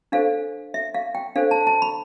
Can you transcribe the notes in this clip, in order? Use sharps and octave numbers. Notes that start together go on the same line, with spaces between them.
D4 A4 C5 F5
E5
F5
G5
D4 A4 C5 F5
A5
A5
B5